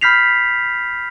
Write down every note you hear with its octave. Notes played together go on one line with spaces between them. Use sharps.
B5 F6 G6 B6 C7 F7